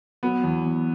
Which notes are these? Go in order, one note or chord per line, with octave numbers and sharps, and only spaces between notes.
F#3 B3
E2
E2